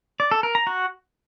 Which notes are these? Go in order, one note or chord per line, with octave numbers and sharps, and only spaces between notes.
D5
A4
A#4
A#5
F#4